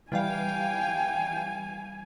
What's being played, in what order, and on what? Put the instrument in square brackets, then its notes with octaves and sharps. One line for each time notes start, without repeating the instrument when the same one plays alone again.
[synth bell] E3 G3 F5 [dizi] G5 [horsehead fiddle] G#5